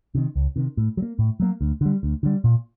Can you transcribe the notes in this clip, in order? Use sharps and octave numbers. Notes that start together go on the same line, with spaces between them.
C3 D#3
C#2
C3 D#3
A2
F#3
A#3
A2
F#3 A#3
D2
D3 G3
D2
D3 G3
A#2